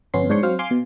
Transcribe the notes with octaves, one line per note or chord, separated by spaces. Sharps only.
G1 F2 B3 C#4 C6
G#2 D4 C5 C#5 C6 C#7
F#3 C4 C5 F5
F5 G#5 C6 D6
B2